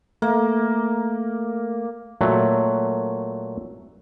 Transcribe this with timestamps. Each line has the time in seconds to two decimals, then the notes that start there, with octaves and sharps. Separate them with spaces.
0.22 A3 A#3
2.21 A#2 F#3 A3